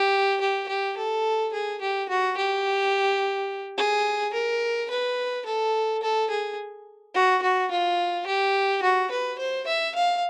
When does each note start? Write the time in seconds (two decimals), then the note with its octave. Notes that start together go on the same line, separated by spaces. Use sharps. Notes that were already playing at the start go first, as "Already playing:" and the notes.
Already playing: G4
0.41 G4
0.69 G4
0.97 A4
1.53 G#4
1.81 G4
2.09 F#4
2.37 G4
3.77 G#4
4.34 A#4
4.90 B4
5.46 A4
6.02 A4
6.30 G#4
7.14 F#4
7.42 F#4
7.71 F4
8.27 G4
8.83 F#4
9.11 B4
9.38 C5
9.67 E5
9.95 F5